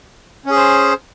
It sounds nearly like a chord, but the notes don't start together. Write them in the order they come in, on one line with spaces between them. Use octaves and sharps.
C#4 G#4 C5